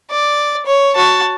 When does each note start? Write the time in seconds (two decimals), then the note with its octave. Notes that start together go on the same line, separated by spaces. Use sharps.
0.11 D5
0.66 C#5
0.96 F#4 A5